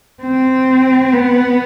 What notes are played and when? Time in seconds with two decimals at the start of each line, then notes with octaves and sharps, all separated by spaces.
0.22 C4
1.13 B3